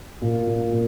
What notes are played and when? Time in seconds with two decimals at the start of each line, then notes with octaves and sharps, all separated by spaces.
0.22 A#2
0.47 A#2
0.72 A#2